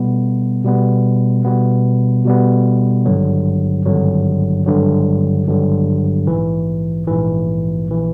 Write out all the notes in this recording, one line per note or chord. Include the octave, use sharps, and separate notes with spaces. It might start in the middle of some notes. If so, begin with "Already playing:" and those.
Already playing: B2 G3 B3
B2 G3 B3
B2 G3 B3
B2 G3 B3
G#1 G2 D3 F#3
G#1 G2 D3 F#3
G#1 G2 D3 F#3
G#1 G2 D3 F#3
A#1 G#2 E3
A#1 G#2 E3
A#1 E3